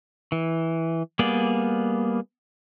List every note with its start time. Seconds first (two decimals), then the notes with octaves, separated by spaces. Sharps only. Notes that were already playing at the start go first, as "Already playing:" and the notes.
0.32 E3
1.19 G3 A#3 B3 G#4 D5